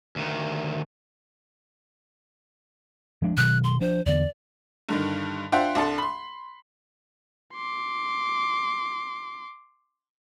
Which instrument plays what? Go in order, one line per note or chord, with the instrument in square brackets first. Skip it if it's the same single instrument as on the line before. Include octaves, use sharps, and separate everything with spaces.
[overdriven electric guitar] D2 D#3
[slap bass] F3 G#3 D4
[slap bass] B2 D#3 F#3 [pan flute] F#6
[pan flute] C6
[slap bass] F3 D4 [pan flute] C5
[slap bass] E2 D3 B3 [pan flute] D5
[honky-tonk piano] G2 D3 D#3
D4 F4 C5 E5 F#5 G5
C2 D4 A4 C6
B5 C6
[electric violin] C6 D6